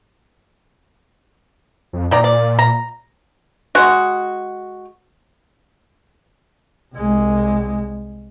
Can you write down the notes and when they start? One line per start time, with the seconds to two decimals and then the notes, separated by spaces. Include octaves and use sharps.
1.93 F2
2.11 A#2 D#3 D5 A#5
2.24 D5
2.59 A#5
3.75 G#3 F#4
6.94 C2 G#3